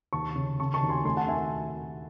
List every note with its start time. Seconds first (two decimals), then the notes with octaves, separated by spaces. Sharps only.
0.13 D#2 A5 C#6
0.36 C#3
0.59 C#3 A5 C#6
0.74 A5 C#6
0.82 D#2
0.89 G#5 C6
1.05 A3 G#5 C6
1.17 F#5 A5
1.28 D#3 E5 G#5